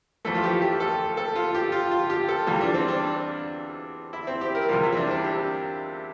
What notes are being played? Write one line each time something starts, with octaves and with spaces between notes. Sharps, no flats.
F2 E3 A3 A4
F4
G4
G4
A4
A4
F4
G4
F4
F4
G4
A4
E2 E3 G3 F4
D4
C4
D4
E4
C4
G4
A#4
E2 C3 G3 F4
E4
C4
D4
D4
G4